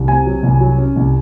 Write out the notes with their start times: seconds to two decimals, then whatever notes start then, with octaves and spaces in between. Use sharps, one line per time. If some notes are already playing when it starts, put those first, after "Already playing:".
Already playing: C2
0.08 C3 G#5
0.26 F#3
0.43 C2
0.60 F#3
0.78 C#4
0.96 C2